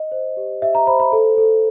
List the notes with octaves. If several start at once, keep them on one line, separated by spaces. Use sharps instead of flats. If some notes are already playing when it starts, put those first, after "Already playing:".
Already playing: D#5
C5
G4
G4 E5
A#5
C5 B5
B5
A4
A4